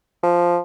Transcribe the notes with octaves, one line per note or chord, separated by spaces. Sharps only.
F3